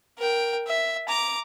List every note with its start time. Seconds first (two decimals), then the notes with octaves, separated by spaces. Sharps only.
0.18 A#4 G5
0.67 E5
1.08 A#5 D6